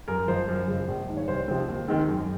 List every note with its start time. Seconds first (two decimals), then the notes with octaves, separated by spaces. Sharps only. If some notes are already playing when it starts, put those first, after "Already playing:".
0.08 F#2 A#4
0.28 F3 G#3 C5
0.48 F#2
0.68 C#3 F3 G#3
0.88 A#1
1.08 G#2 D#3
1.17 C#5
1.28 C2 C5
1.48 C3 F3 G#3 C4
1.68 D#2
1.88 D#3 G#3 C4
2.08 F#2